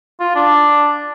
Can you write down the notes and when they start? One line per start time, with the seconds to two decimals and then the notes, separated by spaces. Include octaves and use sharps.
0.20 F4
0.35 D4